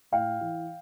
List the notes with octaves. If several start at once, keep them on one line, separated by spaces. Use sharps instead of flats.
A2 F5 G5
E3